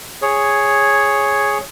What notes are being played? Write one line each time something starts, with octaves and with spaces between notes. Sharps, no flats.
G#4 C#5